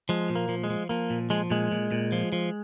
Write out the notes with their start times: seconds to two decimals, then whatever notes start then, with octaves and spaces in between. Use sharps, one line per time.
0.09 F3 G#3
0.30 A#2
0.35 A#3
0.49 F3
0.64 G#3
0.70 F3
0.89 F3 A#3
1.10 A#2
1.30 F3 G#3
1.50 A#2 G#3
1.72 A#2
1.91 A#2
2.12 F3
2.32 F3